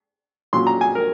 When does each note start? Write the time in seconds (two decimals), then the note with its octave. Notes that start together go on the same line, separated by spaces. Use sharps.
0.53 A#2 F#3 C#4 C6
0.67 A#5
0.81 G#5
0.95 A#4